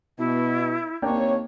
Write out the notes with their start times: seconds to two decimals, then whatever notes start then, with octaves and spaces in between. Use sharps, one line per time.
0.18 B2 E4
1.02 D#2 A#3 C4 D4 C#5 G5